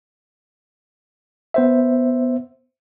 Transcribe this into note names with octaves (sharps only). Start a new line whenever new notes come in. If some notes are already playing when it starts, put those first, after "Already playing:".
B3 C5 E5